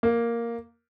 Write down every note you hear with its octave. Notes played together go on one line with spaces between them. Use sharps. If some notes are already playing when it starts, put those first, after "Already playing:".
A#3